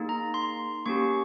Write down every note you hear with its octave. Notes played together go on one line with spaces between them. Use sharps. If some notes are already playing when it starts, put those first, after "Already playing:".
Already playing: A#3 D#4 G#4
A#5
C6
A#3 C#4 G4 C#6